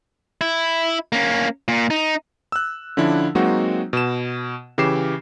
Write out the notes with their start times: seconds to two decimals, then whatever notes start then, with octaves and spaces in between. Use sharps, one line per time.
0.41 E4
1.12 A#3 C#4
1.68 A#2
1.90 D#4
2.52 E6 F#6
2.97 D3 F3 C#4 D4 E4
3.35 F#3 G#3 A#3 C4 D#4 F#4
3.93 B2 E7
4.78 C#3 E3 G4 D6 C7 E7